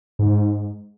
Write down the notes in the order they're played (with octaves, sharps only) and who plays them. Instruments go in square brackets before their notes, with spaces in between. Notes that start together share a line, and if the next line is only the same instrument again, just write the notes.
[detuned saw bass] G#2